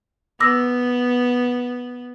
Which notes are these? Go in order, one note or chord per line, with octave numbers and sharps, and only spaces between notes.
B3 D6 E6 A#6